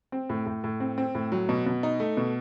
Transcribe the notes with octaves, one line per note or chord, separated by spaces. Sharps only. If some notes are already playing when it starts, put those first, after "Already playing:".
C4
A2
A2
A2
C4
C4
A2
F#3
B2
B2
D#4
A3
B2